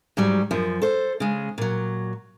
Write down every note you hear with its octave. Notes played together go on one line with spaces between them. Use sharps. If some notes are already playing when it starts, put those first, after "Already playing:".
G#2 F#3 G3
F#2 F3
A4 C5
C#3 G#3
A#2 F#3